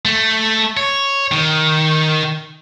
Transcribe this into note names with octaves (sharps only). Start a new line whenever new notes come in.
A3
C#5
D#3